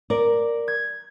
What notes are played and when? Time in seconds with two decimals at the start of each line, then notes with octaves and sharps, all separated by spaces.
0.10 A#4 D5
0.68 G#6